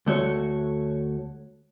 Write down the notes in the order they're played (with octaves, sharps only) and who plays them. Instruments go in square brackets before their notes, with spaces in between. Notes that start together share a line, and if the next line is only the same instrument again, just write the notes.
[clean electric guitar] D2 A3 F#4 C#5